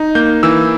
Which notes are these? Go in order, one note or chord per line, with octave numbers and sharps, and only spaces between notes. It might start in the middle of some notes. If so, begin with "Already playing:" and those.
Already playing: D#4
A#3 G6
E3 E6